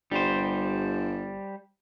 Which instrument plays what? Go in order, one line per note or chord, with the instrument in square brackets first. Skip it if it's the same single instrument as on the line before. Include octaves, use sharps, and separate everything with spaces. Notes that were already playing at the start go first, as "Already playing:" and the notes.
[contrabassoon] G1 [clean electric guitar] G3 C5